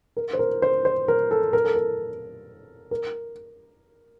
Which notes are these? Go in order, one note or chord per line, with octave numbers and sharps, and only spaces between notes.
A#4
C5
A#4
C5
C5
A#4
A4
A#4
A4
A#4
A#4